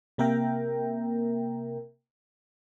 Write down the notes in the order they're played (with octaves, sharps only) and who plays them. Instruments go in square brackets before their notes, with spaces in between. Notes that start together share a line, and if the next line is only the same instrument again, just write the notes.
[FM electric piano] C3 A#3 A#4 E5 G5 A#5